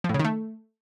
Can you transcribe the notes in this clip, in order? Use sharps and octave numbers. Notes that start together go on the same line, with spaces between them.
F3
A2
C#3
D#3
A3